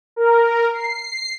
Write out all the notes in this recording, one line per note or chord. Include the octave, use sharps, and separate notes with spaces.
A#4
C7